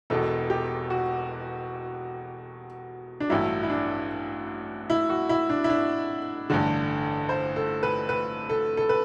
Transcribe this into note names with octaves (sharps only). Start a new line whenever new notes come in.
E1 E2 B2 A4
G4
F#4
D4
A1 G2 F#3 E4
E4
D4
E4
F#4
E4
D4
E4
D4
A1 G2 D3
C5
A4
B4
B4
A4
A4
B4